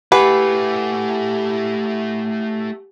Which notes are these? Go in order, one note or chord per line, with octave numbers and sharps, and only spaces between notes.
A3 E4 G4 B4 F#5 G#5